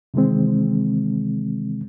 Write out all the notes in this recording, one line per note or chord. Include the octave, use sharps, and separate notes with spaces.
C3 D#3 E3 G#3 C4